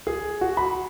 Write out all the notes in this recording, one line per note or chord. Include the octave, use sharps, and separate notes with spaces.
G#4
F#4
B5